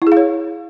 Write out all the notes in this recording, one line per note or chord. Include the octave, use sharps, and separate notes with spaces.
E4
G#4
F5
C#5